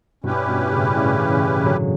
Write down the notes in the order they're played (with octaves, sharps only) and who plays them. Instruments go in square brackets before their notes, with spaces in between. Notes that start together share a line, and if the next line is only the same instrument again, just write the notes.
[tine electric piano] G2 B2 [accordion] G3 C#4 E4 G4 B4
[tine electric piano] G2 B2
A2 C#3
A2 C#3
C#3 E3
D3 F#3